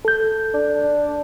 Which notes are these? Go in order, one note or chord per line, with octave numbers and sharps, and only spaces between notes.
A4 G6
D4